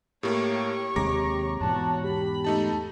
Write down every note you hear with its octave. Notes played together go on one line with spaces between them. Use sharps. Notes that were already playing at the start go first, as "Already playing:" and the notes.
A2 A#3 G4 C#5 C#6
D#2 C3 G#3 A#5 D6 A#6
E2 G#2 B2 F#4 C#5 A5
G4 B5
A3 D#4 A5